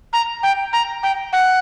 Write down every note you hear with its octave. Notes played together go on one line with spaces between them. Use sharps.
A#5
G5
A#5
G5
F#5